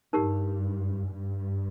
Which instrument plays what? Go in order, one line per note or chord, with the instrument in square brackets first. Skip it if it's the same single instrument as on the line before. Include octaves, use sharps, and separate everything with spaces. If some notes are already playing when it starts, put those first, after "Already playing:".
[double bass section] G2 [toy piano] D#4 G4 A#4
[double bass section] G2